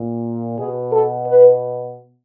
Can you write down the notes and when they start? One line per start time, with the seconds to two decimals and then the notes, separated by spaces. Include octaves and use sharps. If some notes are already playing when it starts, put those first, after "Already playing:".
Already playing: A#2
0.58 B2 G#4
0.92 A4
1.27 B4